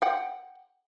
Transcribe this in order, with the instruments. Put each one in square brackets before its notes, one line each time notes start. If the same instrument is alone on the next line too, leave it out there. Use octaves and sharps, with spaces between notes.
[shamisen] F#5 G5